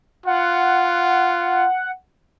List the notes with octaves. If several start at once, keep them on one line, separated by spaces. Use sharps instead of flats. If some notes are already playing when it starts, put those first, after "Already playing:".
F4 F#5